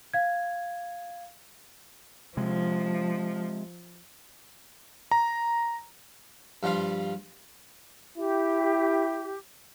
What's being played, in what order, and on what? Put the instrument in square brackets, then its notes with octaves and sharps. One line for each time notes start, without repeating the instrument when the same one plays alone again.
[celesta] F5 G#6
[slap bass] C3 G#3 [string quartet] F3
[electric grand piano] A#5
[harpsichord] G2 F3 G3 F4 C6
[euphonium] E4 [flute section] G4